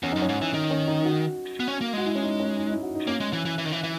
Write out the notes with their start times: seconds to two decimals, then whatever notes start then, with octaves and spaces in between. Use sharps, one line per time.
0.03 E2 C#4
0.12 F#2 D#4
0.22 C#4
0.29 G#2
0.42 E3
0.54 D#3 D#4
0.71 C#4
0.88 D#4
1.05 F#4
1.60 B3
1.68 C#4
1.81 A#3
1.93 G#3 F#4
2.06 E4
2.15 C#4
2.23 D#4
2.40 C#4
2.57 D#4
2.69 E4
2.82 F#4
2.95 D#4
3.07 A#3 C#4
3.20 G#3
3.33 E3
3.45 E3
3.58 E3
3.65 D#3
3.72 E3
3.83 E3